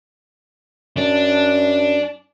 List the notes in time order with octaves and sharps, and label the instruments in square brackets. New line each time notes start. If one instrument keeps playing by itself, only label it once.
[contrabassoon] F#2 [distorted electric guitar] D4